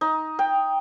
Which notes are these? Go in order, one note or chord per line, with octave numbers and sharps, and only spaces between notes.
D#4
G5